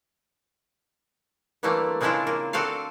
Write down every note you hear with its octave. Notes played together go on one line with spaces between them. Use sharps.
D3 E3 G3 A3 A#3 C4
C#3 G#3 C4 D4 E4 F4
A#3
D3 C4 F#4 A4 F5